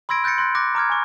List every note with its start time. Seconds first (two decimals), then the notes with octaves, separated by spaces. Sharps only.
0.09 B5 C6 E6 G#6 A#6 D7
0.24 F#6 G6 A6 A#6 C#7
0.38 C6 F#6 A#6
0.55 D6 F#6 A#6
0.75 A#5 D6 F6 G#6
0.90 G#5 C#6